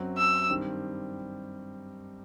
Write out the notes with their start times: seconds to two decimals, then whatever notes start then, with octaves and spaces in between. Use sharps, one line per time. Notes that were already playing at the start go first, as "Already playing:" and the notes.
Already playing: F#2 F#3 C4
0.17 E6
0.50 G2 D#3 G3 C4